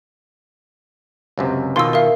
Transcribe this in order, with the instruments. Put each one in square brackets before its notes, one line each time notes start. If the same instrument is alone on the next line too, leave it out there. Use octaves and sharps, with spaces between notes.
[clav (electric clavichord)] C#2 F#2 C3
[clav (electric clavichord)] B2 D#3 F4 [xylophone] C6 E6
[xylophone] A#4 E5 F5